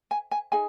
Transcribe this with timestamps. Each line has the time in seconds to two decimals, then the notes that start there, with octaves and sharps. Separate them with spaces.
0.11 G#5
0.31 G#5
0.52 D#4 G#4 G#5